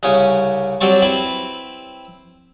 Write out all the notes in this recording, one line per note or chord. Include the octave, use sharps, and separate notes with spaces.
C2 C#3 C#4 D#6
F#3 G3 C4 A5 C#6
C4 E4 B4